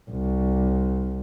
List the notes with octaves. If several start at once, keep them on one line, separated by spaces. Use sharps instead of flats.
C2